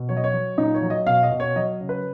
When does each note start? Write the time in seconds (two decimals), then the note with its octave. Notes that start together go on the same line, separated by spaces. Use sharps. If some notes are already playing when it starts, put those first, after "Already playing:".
Already playing: B2
0.09 F#3 C#5
0.17 D#5
0.24 C#5
0.33 F#3
0.58 A#2 D#4
0.75 C#5
0.82 F#3
0.90 D#5
1.07 B2 F5
1.23 D#5
1.31 B2
1.40 C#5
1.56 F#3 D#5
1.81 C#3
1.89 B4